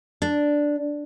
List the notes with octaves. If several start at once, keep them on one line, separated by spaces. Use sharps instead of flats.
D4